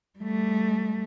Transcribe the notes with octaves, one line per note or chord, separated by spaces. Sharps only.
G3 A3